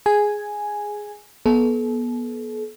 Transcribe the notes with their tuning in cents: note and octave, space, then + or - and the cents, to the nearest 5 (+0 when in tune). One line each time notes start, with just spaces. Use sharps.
G#4 +0 G#5 +0
B3 -30 A4 -40